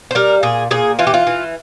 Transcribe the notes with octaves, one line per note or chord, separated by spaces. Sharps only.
C5
G3 A#4
A#2 G#4
A#2 G#4
E3 F4
G4
F4
E3